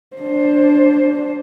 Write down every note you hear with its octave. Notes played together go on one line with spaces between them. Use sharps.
D4 C5